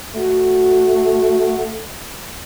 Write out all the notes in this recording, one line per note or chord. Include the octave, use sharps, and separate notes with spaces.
A3 F#4